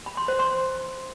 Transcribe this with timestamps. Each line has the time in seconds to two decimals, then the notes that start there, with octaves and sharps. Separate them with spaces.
0.06 B5
0.17 C6
0.28 C5
0.39 C6